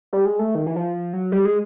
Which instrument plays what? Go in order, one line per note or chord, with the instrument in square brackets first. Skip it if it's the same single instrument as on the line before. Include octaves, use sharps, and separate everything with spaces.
[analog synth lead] G3
G#3
A3
D#3
E3
F3
F#3
G3
G#3